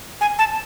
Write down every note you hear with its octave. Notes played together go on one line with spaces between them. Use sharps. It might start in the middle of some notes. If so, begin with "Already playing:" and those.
G#5
A5